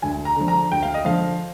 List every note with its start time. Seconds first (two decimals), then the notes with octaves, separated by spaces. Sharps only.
0.02 D2 G#5
0.25 A#5
0.37 D3 F3
0.48 A#5
0.71 D2 G5
0.83 F5
0.94 D#5
1.05 D3 F3 F5